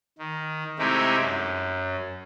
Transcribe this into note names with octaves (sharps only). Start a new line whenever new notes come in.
D#3
C3 G#3 A3 D#4 E4 G4
F#2